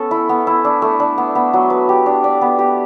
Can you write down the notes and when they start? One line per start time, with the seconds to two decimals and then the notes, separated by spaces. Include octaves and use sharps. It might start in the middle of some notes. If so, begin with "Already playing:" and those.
Already playing: B3 C#4 A4
0.11 E4
0.29 B3
0.47 E4
0.65 D4
0.82 A3
1.00 D4
1.18 B3
1.35 B3
1.53 F#3
1.70 B4
1.89 G4
2.06 D4
2.24 D5
2.42 B3
2.59 G4